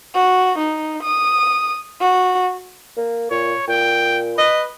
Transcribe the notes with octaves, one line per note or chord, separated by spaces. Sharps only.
F#4
D#4
D#6
F#4
A#3
A#2 C#5
A#2 G5
B4 D#5